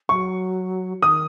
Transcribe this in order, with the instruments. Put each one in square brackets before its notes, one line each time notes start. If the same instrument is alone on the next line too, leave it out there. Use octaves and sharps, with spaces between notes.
[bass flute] F#3 [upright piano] C#6
[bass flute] D#3 [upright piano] D#6